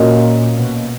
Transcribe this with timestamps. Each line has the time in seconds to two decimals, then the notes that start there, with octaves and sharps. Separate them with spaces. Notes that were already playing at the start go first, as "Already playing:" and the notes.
Already playing: A#2 A#3 C#4 F#4 A#4 D#5
0.58 B2